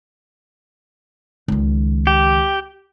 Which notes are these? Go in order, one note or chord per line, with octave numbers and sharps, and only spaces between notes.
C#2 D#3
G4